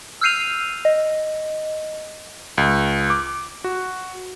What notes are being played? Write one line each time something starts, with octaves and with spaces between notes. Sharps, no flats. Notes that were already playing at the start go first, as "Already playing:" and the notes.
E6 F6 G6 C7 D#7 F7
D#5
C#2
D6
F#4